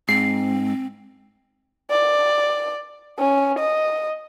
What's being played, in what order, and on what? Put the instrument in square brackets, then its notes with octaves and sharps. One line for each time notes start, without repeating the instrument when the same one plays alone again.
[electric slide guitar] G#2 [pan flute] C4 [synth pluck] C7
[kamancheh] D5
C#4
D#5